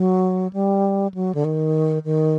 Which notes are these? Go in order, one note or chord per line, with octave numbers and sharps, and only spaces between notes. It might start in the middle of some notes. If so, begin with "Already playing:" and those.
Already playing: F#3
G3
F#3
D3
D#3
D#3